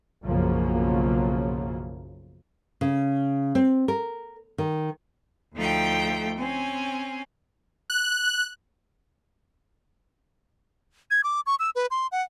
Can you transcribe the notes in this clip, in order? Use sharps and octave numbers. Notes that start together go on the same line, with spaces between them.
B1 F#2 C#3 F3 F#3 A#3
C#3
C4
A#4
D#3
D2 F3 A3 D#4 G5
C4 C#4 G#5
F#6
G#6
D6
C#6
E6
B4
C6
F#5